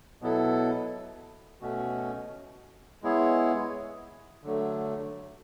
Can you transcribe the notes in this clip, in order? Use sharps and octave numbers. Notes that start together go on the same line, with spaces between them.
B2 F#3 B3 E4 A4
B2 A3 C#4 F#4
G#3 B3 E4 G#4 C#5
D3 F#3 A3